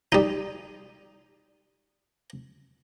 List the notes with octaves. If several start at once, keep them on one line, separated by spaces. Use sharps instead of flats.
G3 D#4